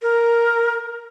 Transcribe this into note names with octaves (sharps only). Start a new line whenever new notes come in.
A#4